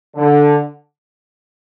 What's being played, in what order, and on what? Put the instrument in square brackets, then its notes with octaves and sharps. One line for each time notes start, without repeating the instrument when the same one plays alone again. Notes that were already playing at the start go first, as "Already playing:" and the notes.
[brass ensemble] D3